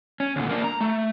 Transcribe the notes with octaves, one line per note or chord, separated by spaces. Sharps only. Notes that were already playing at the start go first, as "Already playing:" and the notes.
C#4
D2 A#2
A#3 D4
A#5
A3